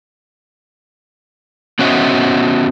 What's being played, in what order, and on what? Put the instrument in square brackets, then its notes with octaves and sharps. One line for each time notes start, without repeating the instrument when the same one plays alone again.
[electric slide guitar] B3 C#4 F#4 C5 D#5 E5